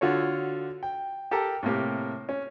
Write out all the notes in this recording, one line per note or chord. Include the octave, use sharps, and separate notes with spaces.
D3 F4 F#4 A4 C#5
G5
G4 A4 A#4 G5 A5 A#5
A2 C3 A#3 G4
C#4